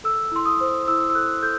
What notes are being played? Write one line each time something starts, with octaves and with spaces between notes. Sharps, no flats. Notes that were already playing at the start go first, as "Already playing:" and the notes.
A4 E6
E4 C6
D#6
C5
E4 E6
E6
A4 F#6
A4 G6